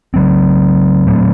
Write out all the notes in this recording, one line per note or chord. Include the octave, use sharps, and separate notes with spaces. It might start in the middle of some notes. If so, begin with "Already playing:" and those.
C#3 F#3 C4
A#2 F#3 A3 C4